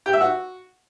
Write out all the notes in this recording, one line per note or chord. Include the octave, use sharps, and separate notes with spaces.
G4
E5
F#4